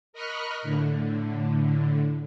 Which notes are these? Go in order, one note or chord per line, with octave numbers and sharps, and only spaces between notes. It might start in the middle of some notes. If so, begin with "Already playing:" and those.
A#4 D#5 B5 C#6 F6 F#6
A2 D3